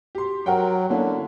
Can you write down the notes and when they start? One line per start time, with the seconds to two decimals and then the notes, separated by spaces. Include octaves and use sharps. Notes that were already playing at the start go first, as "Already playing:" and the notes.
0.15 G4 C6
0.46 F#3 A#4 F#5 G5
0.90 D3 A#3 C#4 E4